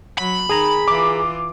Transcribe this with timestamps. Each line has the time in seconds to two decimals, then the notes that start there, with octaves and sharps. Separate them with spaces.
0.18 F#3 B5
0.49 D#3 G#4 G#5 A#5
0.88 E3 F4 D6